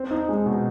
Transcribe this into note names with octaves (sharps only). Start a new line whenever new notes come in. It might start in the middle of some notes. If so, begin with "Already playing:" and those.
Already playing: C4
D#4
G#3
B2